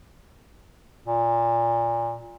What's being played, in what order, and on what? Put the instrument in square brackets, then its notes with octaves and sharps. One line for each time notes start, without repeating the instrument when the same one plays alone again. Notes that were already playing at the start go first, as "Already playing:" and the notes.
[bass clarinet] A#2